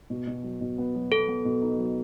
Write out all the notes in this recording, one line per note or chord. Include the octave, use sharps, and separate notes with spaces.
B2
B2
F#3
B2
B3
F#3
B3 A4
B3
B2
D#4
F#3